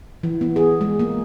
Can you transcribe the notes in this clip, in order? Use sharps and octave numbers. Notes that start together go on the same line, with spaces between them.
E3
B3
G#4
G#3
A#3